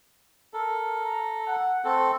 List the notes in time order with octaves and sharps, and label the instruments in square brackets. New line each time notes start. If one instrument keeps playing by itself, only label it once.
[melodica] A4 [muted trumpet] A#4
[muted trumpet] A#5
F#5
[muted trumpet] A3 [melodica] C4 A4